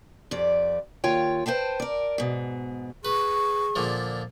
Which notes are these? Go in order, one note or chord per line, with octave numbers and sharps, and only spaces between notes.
F2 G3 D5
D#2 F4 C#5 G5
B4 C5 E5 G5 A5
A#4 D5
G#2 B2
G#4 B4 C#6
A#2 D3 F3